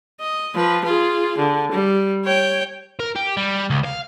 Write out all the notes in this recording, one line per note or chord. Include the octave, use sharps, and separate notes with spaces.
D#5
F3 B4
F4 G#4
D3
G3
C#5 G5
A#4
G4
G3
C#2
F5